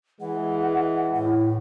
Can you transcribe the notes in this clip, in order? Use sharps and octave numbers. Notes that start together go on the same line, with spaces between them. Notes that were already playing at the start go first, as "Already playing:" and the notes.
E3 G#3 F#5
A2 E4